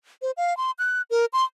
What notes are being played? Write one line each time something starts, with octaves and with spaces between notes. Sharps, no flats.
C5
F5
C6
F#6
A#4
C6